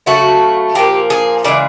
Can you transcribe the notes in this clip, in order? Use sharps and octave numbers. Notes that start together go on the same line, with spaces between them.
C#3 F#3 A3 F#4
A#2 F3 A#3 G4
G#4
C#3 E3 G#3 D5